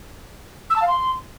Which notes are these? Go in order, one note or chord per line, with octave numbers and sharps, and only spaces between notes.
E6
A5
F5
C6